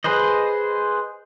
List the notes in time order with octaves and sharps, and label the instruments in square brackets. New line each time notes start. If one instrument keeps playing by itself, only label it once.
[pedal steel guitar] G#4 B4 C5 D#5